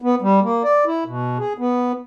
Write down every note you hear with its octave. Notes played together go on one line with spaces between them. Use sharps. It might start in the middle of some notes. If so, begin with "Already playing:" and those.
B3
G3
A#3
D5
E4
B2
G#4
B3